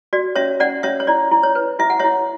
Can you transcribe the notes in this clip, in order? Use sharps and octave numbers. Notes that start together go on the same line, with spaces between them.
F#4 D5
C#4 C#5 E5
C#4 D5 F#5
C#4 C#5 E5
C#5
E4 D5
E4
C#5
B4
E4 E5
F#5
E4 C#5 E5